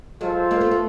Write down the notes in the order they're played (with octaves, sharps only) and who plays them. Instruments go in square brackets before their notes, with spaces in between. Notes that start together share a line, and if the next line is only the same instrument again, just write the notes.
[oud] F#3 G#3 [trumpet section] F4 A4 C5 F5
[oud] G#3 A#3
A3 B3
A3 B3